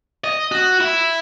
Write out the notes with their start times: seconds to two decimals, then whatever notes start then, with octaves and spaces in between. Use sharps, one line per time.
0.24 D#5
0.52 F#4
0.81 E4